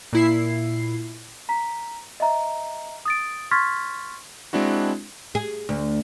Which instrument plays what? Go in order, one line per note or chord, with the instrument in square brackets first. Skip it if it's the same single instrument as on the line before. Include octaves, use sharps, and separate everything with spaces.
[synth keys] A#2 E4 C7
[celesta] A#5 B6
D#5 E5 A#5
D#6 A6 D7
C6 C#6 F6 G#6 A6 B6
[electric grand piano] G#3 C4 D4 E4 F#4
[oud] G#4
D2